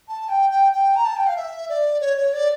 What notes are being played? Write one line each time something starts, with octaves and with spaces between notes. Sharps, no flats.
A5
G5
G5
G5
A#5
A5
G5
F5
E5
D5
C#5
C#5
D5